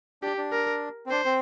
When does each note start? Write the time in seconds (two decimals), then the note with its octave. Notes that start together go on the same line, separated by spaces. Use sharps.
0.22 D4 G4
0.38 D4
0.52 A#4
1.06 C4
1.11 D4 C5
1.25 C4